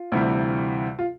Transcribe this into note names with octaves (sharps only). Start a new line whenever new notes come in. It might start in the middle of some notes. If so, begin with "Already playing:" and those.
Already playing: F4
D2 C3 E3 G3
F4